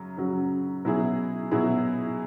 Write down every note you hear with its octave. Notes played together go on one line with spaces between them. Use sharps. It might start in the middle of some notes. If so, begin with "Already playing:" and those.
Already playing: F#2 C#3 F#3
F#2 C#3 F#3
B2 F#3 E4 G#4
B2 F#3 E4 G#4